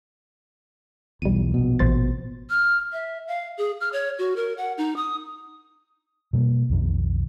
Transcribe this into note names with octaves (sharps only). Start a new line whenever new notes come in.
B1 E2 G3 D#7
A#1 B2
A1 C5 A6
F6
E5
F5
G#4
F6
C#5
F#4
A#4
F#5
D#4
D#6
B2 G3 A3 A#3
B1 F2 D#3